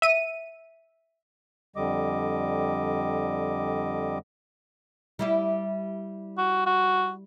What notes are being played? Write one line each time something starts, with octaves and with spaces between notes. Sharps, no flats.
E5 D#7
F2 D3 G3 D#5 D6
G3 E4 G4
F#4
F#4